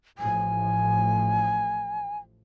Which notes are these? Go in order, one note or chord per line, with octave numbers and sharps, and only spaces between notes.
A1 A2 F3 G#5